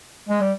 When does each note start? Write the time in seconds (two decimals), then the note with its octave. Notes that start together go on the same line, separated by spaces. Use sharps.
0.29 G#3
0.41 G3